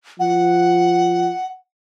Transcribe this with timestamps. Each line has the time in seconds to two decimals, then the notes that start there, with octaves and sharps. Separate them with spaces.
0.20 F3 F#5